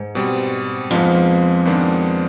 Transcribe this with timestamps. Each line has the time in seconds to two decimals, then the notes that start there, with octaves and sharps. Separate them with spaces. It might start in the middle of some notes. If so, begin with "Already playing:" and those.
Already playing: G#2
0.15 B2 G3 C4
0.91 F2 G#2 F3 G#3 B3
1.65 G#2 D#3 G#3 B3 D4